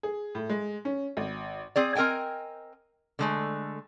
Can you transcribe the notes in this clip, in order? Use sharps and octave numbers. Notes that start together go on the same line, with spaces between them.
G#4
A2
G#3
C#4
G#1
C4 G#4 D5
C4 A#4 D#5 G5 G#5
D3 G#3 A3